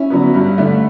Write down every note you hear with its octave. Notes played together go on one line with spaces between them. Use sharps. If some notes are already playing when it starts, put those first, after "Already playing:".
Already playing: C#4 E4
D3 F#3 B3
G2
D3 A3